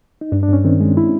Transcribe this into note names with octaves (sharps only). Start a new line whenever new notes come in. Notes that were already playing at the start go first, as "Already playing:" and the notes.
D#4
G2 D4
D4
G2 C#4
D#3 C4
G#3
E4